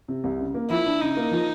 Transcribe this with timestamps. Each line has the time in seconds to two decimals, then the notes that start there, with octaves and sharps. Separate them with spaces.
0.08 C3
0.24 C2
0.39 C#3
0.54 A#3
0.70 F3 E4
0.86 D4
1.01 C#3 D#4
1.17 A#3
1.32 F3